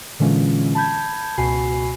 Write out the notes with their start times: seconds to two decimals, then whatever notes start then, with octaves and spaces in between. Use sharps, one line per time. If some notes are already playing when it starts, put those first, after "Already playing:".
0.19 A#2 D3 E3 G#3 C#4 F4
0.75 A5 B5 G6 G#6
1.38 C#2 B2 F#4 G#5 B5 C7